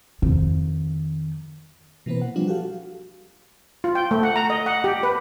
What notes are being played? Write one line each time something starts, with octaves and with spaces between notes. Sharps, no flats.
F2 D#3
B2 E3 A#3 C4 B4
F#5
F3 G3 C4 D4 F4
F#4 G4 A4 F5
F4
G5
A3
F#5
A#5
D#5
F#5
G4
B4